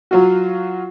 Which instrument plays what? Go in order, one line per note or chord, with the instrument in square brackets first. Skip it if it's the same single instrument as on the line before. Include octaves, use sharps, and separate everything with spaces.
[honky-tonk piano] F#3 F4 F#4